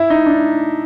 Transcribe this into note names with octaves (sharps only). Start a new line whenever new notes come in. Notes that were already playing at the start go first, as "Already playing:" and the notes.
Already playing: E4
D#4
D4